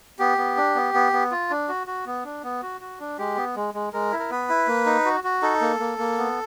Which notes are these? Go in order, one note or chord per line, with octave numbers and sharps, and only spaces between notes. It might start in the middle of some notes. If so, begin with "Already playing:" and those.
B3 G4
B3
D4
B3
B3
B3
F4
D4
F#4
F#4
B3
D4
B3
F#4
F#4
D4
G#3 G4
B3
G#3
G#3
G#3 A#4
E4
A#4
B3 B4
E4
A#3
D#4
F#4
F#4
D#4 A4
A#3
A#3
A#3
B3